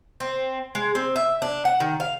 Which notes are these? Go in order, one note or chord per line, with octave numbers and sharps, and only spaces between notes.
C4
G#3
C4
E5
D4
F#5
D#3
F5